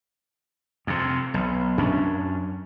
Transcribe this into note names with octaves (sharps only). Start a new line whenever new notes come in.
F2 C3
B1
F#2 C#4 D4